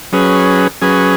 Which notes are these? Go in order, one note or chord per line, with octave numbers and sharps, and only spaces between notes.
F#3 C#4 G#4 B4
F#3 C#4 G#4 B4